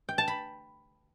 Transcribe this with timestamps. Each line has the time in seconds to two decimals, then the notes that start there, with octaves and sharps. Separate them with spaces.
0.09 G5
0.18 A5
0.28 B5